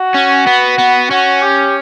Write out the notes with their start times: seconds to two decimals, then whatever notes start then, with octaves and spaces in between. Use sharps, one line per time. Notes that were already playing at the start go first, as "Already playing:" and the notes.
Already playing: F#4
0.15 C#4
0.47 B3
0.78 B3
1.11 C#4 F#4
1.42 G4